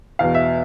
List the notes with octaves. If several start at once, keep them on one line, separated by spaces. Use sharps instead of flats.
E2 B2 F5
E5